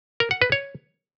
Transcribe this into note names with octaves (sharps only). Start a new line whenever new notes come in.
A#4
F#5
B4
C#5